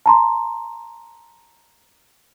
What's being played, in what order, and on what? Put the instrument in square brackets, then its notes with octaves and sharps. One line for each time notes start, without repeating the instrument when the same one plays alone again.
[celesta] A5 A#5 C6